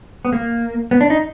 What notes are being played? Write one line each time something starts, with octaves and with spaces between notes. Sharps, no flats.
B3
A#3
B3
D4
D#4